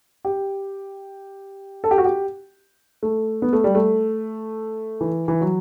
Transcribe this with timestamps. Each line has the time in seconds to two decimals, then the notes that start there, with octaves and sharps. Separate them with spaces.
0.25 G4
1.84 A4
1.91 G4
1.98 F#4
2.05 G4
3.03 A3
3.42 B3
3.53 A3
3.64 G3
3.75 A3
5.01 E3
5.28 E3
5.41 F#3